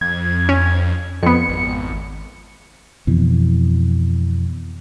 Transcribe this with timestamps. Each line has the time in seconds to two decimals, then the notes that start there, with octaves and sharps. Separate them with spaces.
0.01 F2 G#6
0.49 C#4
1.23 F2 B3 C#7
1.49 G#1
3.07 F2 B2 E3